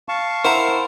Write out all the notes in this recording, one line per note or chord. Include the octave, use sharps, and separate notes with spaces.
F5 A5 C#6
E4 A#4 C5 F#5 A#5